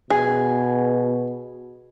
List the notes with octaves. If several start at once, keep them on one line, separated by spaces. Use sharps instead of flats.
B2 G#4